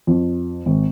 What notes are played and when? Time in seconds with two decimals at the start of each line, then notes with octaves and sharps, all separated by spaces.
0.07 F2
0.66 G#1